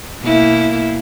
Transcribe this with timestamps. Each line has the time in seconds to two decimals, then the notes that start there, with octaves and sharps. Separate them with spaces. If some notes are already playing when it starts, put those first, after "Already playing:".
0.21 B2 A#3 E4